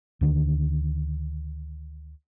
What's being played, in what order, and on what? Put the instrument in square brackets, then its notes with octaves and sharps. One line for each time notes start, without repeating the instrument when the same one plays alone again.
[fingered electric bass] D2 D3 D#3